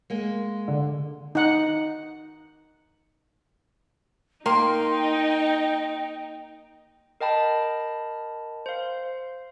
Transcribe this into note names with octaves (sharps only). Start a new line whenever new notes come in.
G#3 A#3
D3
D#4 F#5
A#3 D#4 G5 C6
A#4 D#5 G5 A5 B5
C5 F5